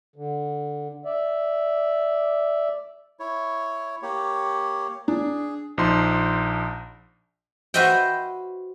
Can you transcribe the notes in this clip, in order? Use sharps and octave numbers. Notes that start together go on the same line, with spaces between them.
D3
D5 E5
E4 C#5
A#3 G4 C#5
D4 G#4
A#1 F3 D#4 C6
F#4 B4 C5 D#5 E5 G5